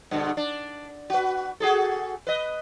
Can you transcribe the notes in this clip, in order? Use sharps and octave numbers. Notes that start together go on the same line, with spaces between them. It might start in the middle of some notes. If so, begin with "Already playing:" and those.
G2 B2 D3
D4
F#4 B4
F#4 G#4 A4
B4 D#5